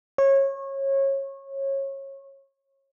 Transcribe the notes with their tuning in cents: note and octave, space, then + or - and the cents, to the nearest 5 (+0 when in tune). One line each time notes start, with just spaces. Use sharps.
C#5 -25